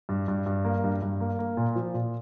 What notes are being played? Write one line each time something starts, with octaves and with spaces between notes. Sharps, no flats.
G2
G2
G2
A#3
G2
G2
A#3
A#3
A#2
F3
A#2